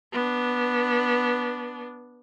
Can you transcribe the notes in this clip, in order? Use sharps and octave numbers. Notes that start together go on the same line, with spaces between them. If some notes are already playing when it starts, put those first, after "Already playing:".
B3 D4